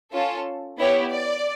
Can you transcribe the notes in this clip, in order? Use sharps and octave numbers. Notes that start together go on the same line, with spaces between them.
C#4 F4 A4
B3 E4 G4 C#5
D5